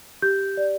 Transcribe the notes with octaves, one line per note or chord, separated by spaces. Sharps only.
G4 G6
D5